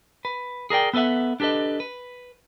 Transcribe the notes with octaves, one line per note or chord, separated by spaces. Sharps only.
B4
G#4 A#4 D5 G5
B3 A4 B4 E5 F#5
D4 G4 A4 B4 D#5
B4